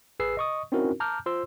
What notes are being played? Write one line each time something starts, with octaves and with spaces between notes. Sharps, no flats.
A1 G#4 B4 E6 C7
D#5 C#6 D#6
C4 C#4 D#4 E4 F#4 A#4
A5 A#5 D6 F6 G6
F4 C5 C6 E6